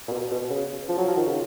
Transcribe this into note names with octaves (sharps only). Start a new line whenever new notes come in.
A#2
B2
B2
C#3
F3
F#3
F3
D#3
C#3